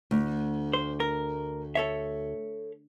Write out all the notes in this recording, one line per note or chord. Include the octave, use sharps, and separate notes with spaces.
D2
C5
A#4
A4 C#5 E5